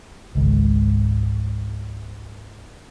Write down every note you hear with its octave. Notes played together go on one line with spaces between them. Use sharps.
G#1 C#2 G#2